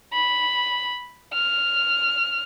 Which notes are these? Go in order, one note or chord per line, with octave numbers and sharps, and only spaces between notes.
B5
F6